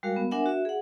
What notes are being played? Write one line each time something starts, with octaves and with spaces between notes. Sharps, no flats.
G3 G#3 F#4 A#4 F5
B3
D4 A#4 E5 F#5 G#5
F#4 E5
G#4 F#5